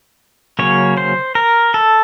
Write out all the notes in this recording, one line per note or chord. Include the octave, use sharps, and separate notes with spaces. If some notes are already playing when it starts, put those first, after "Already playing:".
C#3 F#3 A#3 C#4 C#5
C5
A#4
A4